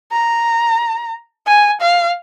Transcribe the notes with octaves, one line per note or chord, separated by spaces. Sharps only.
A#5
G#5
F5